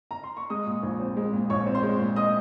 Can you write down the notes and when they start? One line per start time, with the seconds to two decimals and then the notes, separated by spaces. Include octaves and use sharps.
0.11 A#5
0.24 C6
0.37 C#6
0.50 G#3 D#5 D#6
0.67 A#2
0.83 A#1
1.00 C4
1.17 G#3
1.33 A#2
1.50 A#1 C#5 C#6
1.66 C4
1.75 C5 C6
1.83 G#3
1.99 A#2
2.16 D#5 D#6